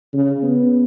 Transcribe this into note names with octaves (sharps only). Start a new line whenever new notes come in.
C#3
B3